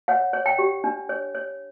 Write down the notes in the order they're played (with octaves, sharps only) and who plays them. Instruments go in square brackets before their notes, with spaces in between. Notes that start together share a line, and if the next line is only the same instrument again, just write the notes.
[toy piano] C#5 F#5
C#5
G5
G4
D4
C#5
C#5